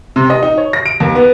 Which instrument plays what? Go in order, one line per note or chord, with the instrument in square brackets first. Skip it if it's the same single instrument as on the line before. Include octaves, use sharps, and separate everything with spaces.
[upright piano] C3
D#5
D#4
C#5
A#6
D7
D#2
B3